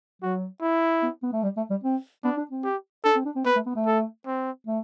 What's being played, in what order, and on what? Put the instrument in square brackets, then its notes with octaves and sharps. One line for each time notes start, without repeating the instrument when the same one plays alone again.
[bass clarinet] F#3 [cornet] F#4
[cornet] E4
[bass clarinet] B3
B3
A3
G3
A3
G3
C4
[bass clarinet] B3 [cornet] D4
[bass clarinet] D4
C4
[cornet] G4
[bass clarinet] D4 [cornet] A4
[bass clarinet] C4
D4
C4
[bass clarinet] B3 [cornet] B4
[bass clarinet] A3
B3
A3
[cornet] A4
C4
[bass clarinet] A3